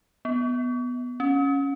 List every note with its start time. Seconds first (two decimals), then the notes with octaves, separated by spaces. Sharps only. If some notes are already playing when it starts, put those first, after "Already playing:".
0.25 B3
1.20 C#4